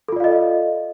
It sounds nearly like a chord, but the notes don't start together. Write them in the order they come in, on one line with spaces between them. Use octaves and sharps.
A4 F4 D5 F5 D#5